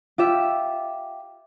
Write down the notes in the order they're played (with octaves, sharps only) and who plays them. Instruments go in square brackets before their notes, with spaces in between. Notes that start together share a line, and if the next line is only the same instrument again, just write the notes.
[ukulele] F4 G4 E5